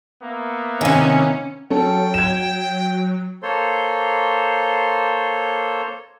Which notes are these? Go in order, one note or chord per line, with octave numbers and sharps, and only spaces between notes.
A#3 B3 E5
C3 D#3 C#4 D#5 G#5
F#3 C#4 A4 G5
G#6 E7
A#3 A4 C5 C#5 C6